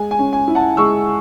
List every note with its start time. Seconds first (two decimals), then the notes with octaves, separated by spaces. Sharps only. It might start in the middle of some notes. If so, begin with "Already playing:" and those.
Already playing: G#3 G#5
0.11 G#5
0.19 C#4
0.33 G#5
0.48 E4
0.55 F#5 A5
0.77 G#3 C#6 E6